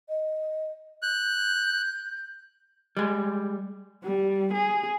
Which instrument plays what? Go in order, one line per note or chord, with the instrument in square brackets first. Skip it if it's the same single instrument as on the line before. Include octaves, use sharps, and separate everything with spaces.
[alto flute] D#5
[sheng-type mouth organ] F#6 [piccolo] G6
[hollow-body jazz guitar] G3 G#3
[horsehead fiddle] G3
G#4